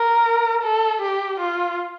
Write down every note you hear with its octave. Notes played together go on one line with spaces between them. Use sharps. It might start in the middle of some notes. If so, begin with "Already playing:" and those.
Already playing: A#4
A4
G4
F4